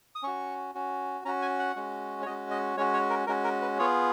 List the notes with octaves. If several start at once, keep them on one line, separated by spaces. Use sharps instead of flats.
D#6
C#4 F#4 C#6
C#4 F#4
C#4 F#4 A#5
G#5
F#5
G#3 C#4 F#4
C#5
G#3 C#4 F#4 D#5
D#5
G#3 C#4 F#4 C#5
C#5
A#4
G#3 C#4 F#4 A#4
A#4
B4
B3 F4 G#4 C#5